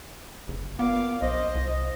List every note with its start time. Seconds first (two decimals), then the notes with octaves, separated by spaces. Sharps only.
0.48 F#1
0.79 A#2 B3 F5 D6
1.22 B1 C5 D#5
1.55 C2